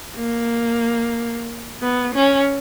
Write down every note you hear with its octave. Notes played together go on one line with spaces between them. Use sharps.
A#3
B3
C#4